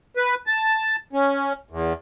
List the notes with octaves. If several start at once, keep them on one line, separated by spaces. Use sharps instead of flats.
B4
A5
C#4
E2